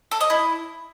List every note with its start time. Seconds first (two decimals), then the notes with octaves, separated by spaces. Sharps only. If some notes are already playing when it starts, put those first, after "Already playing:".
0.11 A4
0.21 D#5
0.30 E4